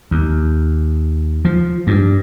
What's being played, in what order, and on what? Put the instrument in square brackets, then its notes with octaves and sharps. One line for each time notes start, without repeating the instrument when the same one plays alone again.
[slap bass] D#2
F3
G2